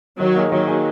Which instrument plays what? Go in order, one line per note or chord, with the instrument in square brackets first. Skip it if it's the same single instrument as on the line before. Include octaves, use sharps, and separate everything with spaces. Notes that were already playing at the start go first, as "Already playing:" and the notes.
[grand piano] D#3 [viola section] F#3
[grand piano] A#3 D#4 G#4
[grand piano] D#3 [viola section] F#3
[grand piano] A#3 D#4 G#4